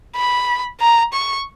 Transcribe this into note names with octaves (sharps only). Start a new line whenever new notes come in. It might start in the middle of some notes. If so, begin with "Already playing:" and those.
B5
A#5
C#6